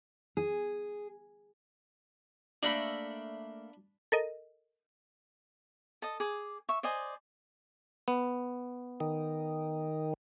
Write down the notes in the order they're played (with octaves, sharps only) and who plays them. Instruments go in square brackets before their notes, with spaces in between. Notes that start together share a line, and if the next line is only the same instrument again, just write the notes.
[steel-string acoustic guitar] G#4
[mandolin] A3 A#3 D5 [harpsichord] D4 B5
[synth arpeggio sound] A4 A#4 D#5
[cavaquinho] A4 D#5
G#4 D6
E5 C#6
C5 D5 D#5 G#5
[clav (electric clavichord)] B3
[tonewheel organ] D#3